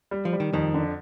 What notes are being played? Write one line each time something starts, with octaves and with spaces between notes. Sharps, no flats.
G3
F3
G3
D#3
F2 D#3
D3